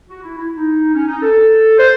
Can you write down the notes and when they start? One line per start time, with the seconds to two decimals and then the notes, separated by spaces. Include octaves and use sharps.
0.09 F#4
0.23 E4
0.38 E4
0.56 D#4
0.94 C#4
1.08 D#4
1.22 A4
1.78 C5